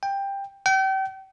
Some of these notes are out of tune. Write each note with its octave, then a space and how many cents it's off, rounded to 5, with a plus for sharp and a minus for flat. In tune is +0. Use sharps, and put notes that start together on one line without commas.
G5 +15
G5 -35